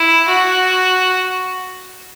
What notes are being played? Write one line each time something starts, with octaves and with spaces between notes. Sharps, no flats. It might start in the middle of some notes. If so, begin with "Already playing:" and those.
Already playing: E4
F#4